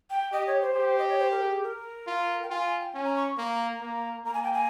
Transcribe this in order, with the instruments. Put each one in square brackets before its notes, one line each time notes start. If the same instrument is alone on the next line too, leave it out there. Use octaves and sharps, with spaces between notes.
[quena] G5
[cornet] G4 [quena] D#5
[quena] C#5
C5
[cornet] G4
[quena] D#5
C#5
C5
A#4
G#4
A#4
[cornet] F4
[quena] G5
[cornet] F4 [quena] G#5
[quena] G#5
G5
[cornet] C#4 [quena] G#5
[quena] A#5
C#6
[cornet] A#3 [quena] A#5
[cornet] A#3
[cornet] A#3 [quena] A#5
[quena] G#5
G5
G#5